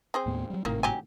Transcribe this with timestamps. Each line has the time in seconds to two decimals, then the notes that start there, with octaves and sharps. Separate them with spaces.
0.14 C4 G#4 C5
0.26 D#2 A2 B3
0.50 F#3 G3
0.65 G#1 A2 C3 D#3 A#3
0.83 F#3 G4 G#5